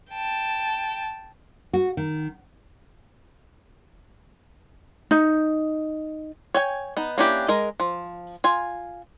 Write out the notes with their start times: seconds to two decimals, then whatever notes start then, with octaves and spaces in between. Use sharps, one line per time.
0.11 G5 A5
1.73 F#4
1.97 D#3
5.11 D#4
6.54 C#5 G5 G#5
6.97 B3 D#4
7.18 A#3 C#4 D4 E4 G4
7.48 G#3 A#4 D#5
7.80 F3
8.44 F4 G#5